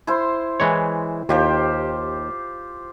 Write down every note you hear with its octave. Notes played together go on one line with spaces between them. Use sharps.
E4 C5 C6
E3 G#3 C#5
D#2 F4 G4 C5